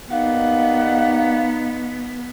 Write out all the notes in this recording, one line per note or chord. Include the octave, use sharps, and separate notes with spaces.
D#2 B3 D#4 D5 F5 F#5